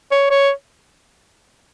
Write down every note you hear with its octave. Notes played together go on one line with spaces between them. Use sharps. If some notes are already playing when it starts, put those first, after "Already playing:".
C#5
C#5